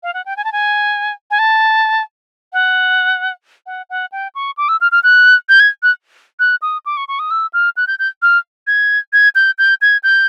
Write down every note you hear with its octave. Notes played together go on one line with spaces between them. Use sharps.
F5
F#5
G5
G#5
A5
G#5
G#5
A5
F#5
F#5
F#5
G5
C#6
D6
E6
F6
F6
F#6
G6
G#6
F#6
F#6
D#6
D6
C#6
C#6
D#6
E6
F6
F#6
G6
G6
F6
G#6
G#6
G6
G6
G#6
G6